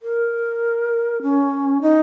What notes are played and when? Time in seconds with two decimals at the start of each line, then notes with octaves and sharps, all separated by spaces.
0.02 A#4
1.22 C#4
1.82 D#4